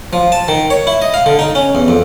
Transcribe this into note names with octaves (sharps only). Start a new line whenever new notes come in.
F3
A5
D#3
C#5
E4
D#5
F5
D3
D#4
C#4
E2
F2